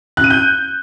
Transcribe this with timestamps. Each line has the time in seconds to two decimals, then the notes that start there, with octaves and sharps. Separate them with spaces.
0.17 F#6
0.24 D#7
0.30 G6